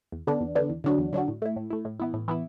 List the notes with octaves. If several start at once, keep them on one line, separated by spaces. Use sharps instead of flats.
E2
D3 B3 D4
E2
D3 B3 D4
E2
D3 F#3 D4 F#4
E2
D3 F#3 D4 F#4
A2
A3 E4
A2
A3 E4
A2
E3 B3 E4
A2
E3 B3 E4